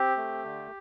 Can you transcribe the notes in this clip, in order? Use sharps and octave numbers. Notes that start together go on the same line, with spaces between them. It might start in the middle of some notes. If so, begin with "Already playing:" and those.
Already playing: C4 G4
A3
D3